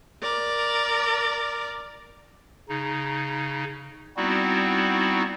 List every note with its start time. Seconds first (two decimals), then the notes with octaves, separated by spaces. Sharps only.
0.22 A#4 D5
2.69 C#3 D#4
4.17 G3 B3 C4 D#4 E4 F#4